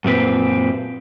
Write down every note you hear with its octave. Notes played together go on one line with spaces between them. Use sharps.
F#2 A#2 C4 B4